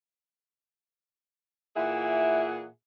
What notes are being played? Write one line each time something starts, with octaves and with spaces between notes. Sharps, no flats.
A#2 E3 E4 G#4 E5 F#5